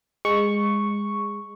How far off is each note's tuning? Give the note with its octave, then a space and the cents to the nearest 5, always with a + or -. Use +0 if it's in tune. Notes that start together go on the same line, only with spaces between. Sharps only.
G#3 -15 C#6 +0